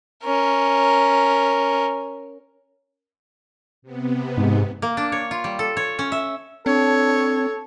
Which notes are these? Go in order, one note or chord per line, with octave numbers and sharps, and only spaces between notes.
C#4 A#4
C3 B3
G#2
A#3
D4
C#5
F4
G3
A4
C#5
C#4
E5
C4 D4 A4 C#5